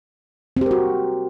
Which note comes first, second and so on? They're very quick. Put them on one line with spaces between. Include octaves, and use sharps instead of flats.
C4 G4 A#4 F#4